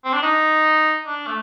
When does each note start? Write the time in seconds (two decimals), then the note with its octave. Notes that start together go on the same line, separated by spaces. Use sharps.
0.05 C4
0.13 D4
0.22 D#4
1.06 D4
1.27 A3